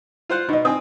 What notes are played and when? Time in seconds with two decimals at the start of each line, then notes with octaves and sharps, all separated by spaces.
0.29 F4 C5 F#5
0.49 B2 D#4 D#5
0.65 C4 D#4 G#5 D#6